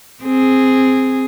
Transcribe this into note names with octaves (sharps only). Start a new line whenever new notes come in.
C4 G#4